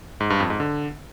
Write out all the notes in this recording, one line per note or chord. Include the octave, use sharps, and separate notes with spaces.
G#2
G2
F2
G#2
D3